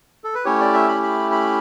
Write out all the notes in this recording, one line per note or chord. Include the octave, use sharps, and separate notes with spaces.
A4
B4
A3 C#4 E4 G4 C#5
D5
E5
B5
B5
B5